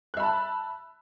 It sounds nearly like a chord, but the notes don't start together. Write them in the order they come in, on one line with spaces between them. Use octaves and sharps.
F#6 E5 B5 A5